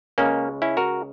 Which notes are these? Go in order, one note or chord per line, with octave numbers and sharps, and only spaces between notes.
C#2 C#3 G#3 A#3 C#4
C#4 E4
F#4 A#4